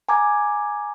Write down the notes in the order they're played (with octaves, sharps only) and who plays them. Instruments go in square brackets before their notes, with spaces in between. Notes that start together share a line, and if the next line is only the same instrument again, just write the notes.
[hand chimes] G#5 A#5 D6 G#6